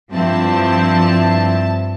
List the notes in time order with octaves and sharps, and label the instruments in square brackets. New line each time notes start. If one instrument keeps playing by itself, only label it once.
[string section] G2 F3 C4 E4 A5